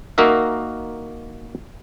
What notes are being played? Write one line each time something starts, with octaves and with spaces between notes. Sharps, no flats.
A#3 D#4 F#4 A#4 E5